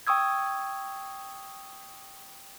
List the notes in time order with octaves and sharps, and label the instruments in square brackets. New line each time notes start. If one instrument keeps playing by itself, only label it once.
[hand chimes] G5 C#6 D#6 E6 G#6